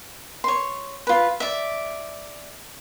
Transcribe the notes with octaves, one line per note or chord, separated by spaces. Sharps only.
C#5 C6
F4 B4
D5 E5